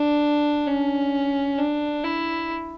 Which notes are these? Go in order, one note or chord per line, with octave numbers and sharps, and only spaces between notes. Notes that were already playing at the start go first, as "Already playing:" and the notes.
Already playing: D4
C#4
D4
E4